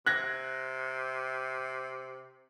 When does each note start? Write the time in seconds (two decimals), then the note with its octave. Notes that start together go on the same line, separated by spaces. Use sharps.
0.06 C3 F#6 G#6 A#6